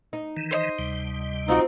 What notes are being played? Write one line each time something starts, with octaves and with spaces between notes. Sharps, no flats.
D#4
D#3 E3
C5 C#5 D#5
D2 C3 G3
C4 D#4 F4 F#4